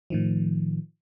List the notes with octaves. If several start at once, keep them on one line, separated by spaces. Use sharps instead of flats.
A2 D#3 F3